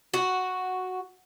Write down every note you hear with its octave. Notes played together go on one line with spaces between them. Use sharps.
F#4